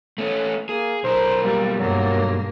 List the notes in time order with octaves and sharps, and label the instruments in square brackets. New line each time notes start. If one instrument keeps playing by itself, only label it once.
[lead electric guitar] A3 C#4
[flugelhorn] A#3 [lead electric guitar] G#4
[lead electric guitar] B1 A#4 [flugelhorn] C5
[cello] G3 [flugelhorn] A#3
[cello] G2 A#3 [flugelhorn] F#3